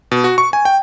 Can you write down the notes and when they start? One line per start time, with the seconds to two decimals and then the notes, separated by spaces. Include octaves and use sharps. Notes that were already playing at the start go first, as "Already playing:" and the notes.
0.11 B2
0.24 F#4
0.38 C#6
0.53 G#5
0.65 G5